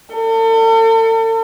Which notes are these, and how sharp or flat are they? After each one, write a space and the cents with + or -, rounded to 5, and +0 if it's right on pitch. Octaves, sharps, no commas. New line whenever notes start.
A4 +40